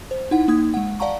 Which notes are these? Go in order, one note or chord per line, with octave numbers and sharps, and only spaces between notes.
C5
D#4 E4 F#5
A#3 D#4 D#6 G#6
G#3 F#5
D5 F5 F#5 A5 A#5 C#6